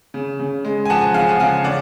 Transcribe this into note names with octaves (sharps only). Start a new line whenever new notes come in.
C#3
C#3
G#3
G#5
F3 F#5 A5
C#3 F5 G#5
F#5
C#3 F5 G#5
C#4 D5 F#5